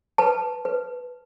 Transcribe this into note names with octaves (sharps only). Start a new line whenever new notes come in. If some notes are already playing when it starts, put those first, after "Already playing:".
B4 A5
B4